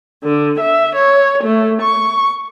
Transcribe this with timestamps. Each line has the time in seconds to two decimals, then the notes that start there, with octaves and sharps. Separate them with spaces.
0.23 D3
0.59 E5
0.94 C#5
1.43 A3
1.81 C#6